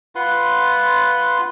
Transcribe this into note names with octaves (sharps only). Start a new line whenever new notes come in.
F4 B4 F#5 C6